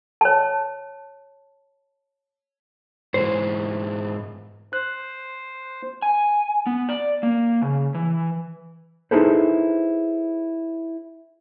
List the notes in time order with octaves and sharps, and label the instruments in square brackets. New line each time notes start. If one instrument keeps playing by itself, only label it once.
[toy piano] C#5 A5
[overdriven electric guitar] G#2 E3 [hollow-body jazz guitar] C5
[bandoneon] C5 [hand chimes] F#6
[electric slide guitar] G#5
B3
D5
A#3
C#3
E3
[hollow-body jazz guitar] D#4 E4 G#4 A4 B4 C5